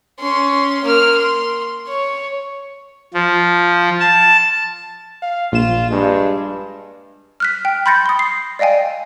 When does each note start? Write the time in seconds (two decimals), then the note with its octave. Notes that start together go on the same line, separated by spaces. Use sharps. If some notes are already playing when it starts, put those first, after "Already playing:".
0.20 C#4 C6
0.84 A#3 F6
1.18 C6
1.87 C#5
3.14 F3
4.00 A5
5.22 F5
5.52 A#1 F4 E7
5.91 G2 G#3
7.40 F6 F#6 B6
7.65 G5
7.86 B5 C6 G6 A6 A#6 C#7
8.06 C6 D#6
8.19 C7
8.59 D5 D#5 F5 G5 G#5